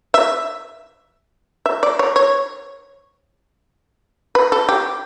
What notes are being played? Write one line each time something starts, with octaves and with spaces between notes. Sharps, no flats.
E5
E5
D5
C#5
C#5
B4
A4
G4